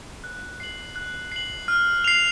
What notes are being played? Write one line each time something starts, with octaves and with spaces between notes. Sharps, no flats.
F#6
C7 F#7
F#6
C7 F#7
F6
C7 F7